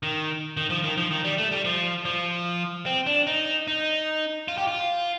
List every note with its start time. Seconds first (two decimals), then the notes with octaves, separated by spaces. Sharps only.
0.03 D#3
0.57 D#3
0.70 F3
0.84 D#3
0.98 F3
1.11 D#3
1.24 G3
1.38 A3
1.52 G3
1.65 F3
2.05 F3
2.86 C4
3.07 D4
3.27 D#4
3.68 D#4
4.48 F4
4.58 G4
4.67 F4